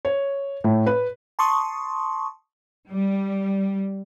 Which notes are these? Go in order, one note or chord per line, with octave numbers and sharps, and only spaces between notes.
C#5
A2
B4
A5 C6 C#6 D#6
G3